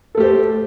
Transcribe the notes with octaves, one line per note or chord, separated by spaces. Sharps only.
A3 G4 A4 C5